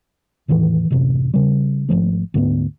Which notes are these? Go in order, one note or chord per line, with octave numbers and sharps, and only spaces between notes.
E2 A2 D#3 E3
A1 F#2 C3
C#3 G3
G#1 C#2 F3 A3
D2 G#2 A3 B3